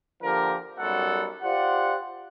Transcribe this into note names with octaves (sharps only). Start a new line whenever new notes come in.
D3 F3 A#3 G4 A#4
B1 F#2 F#3 G3 A4 F#5
F4 G4 C5 D5 F#5